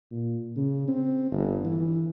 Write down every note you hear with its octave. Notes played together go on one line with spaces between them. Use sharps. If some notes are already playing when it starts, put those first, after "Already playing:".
A#2
C#3
C4
G1
E3